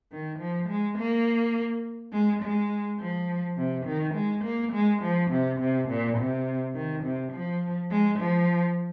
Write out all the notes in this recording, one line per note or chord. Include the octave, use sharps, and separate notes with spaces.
D#3
F3
G#3
A#3
G#3
G#3
F3
C3
D#3
G#3
A#3
G#3
F3
C3
C3
A#2
C3
D#3
C3
F3
G#3
F3